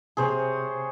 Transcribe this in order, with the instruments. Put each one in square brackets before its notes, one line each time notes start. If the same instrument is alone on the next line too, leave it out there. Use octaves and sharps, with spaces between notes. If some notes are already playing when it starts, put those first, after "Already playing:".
[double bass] C3 [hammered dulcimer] G#4 C5 C#5